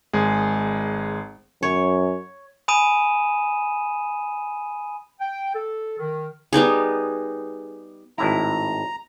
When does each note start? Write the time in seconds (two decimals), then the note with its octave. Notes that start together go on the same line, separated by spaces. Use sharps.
0.13 G#1 G#3 G#4
1.63 F#2 C#5
2.68 G#5 B5 D#6 D#7 E7
5.20 G5
5.55 A4
5.99 D#3
6.53 G3 B3 D#4 G#4
8.18 G#1 A2 E4 A#5